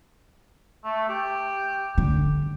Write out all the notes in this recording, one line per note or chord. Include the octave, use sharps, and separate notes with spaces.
A3
G4
D3